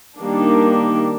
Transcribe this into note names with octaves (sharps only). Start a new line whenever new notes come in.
D#3 G3 A#3 D4